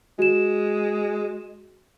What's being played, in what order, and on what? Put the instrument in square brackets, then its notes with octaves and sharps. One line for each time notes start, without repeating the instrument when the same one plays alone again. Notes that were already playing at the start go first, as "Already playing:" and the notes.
[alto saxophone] G#3 [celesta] F#4 E7